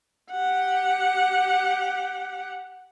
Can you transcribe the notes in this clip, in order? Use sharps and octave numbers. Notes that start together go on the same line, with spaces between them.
G4 F#5